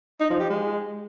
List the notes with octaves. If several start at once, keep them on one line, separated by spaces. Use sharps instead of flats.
D#4
F3
G4
G#3